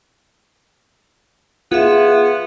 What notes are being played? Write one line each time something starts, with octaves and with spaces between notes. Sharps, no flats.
B3 F4 G#4 E5